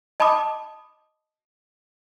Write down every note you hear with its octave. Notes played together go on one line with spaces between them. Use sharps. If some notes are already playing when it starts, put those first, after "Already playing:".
D#5 A5 B5 D6 D#6